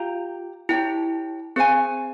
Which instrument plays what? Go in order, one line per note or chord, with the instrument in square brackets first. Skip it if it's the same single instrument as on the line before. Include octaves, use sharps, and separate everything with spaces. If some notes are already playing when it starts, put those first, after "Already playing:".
Already playing: [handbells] F4 [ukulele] G4 F5 A#5
[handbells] E4 [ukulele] G4 C#5 G5 A#5
[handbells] C4 [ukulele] G#4 C5 F5 G#5